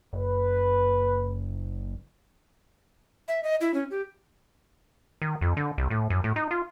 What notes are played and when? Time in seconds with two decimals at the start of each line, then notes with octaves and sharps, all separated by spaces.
0.13 F#1 B4
3.28 E5
3.43 D#5
3.61 E4
3.74 C#4
3.91 G4
5.22 D#3
5.41 F2
5.57 D3
5.78 C2
5.90 A2
6.10 F#2
6.24 A2
6.36 D#4
6.51 F4